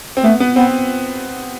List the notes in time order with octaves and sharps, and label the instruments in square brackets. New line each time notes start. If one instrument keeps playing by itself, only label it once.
[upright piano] C4
[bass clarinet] A3 [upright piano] B3
[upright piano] B3
[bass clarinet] B3 [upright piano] C4